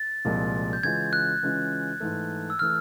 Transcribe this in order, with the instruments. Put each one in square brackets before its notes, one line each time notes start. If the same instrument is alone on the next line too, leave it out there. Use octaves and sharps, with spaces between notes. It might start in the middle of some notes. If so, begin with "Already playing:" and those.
Already playing: [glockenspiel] A6
[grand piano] C2 A#2 F3 G#3
[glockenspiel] G6
[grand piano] C#3 E3 G#3 C#4 F4 [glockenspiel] G#6
[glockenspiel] F#6
[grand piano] C#3 E3 G#3 C#4 F4
G#2 E3 A3
[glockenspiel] E6
[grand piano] E3 A3 [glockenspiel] F6